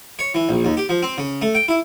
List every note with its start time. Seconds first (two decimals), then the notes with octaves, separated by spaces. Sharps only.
0.19 C#5
0.34 E3
0.49 A#1
0.65 D#2
0.77 G4
0.89 F3
1.03 C4
1.18 C#3
1.42 A3
1.55 G5
1.68 E4